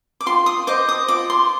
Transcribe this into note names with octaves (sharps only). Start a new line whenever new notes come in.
D6
F4 C6
D#6
C5 D#5 D6
D#6
F4 D6
C6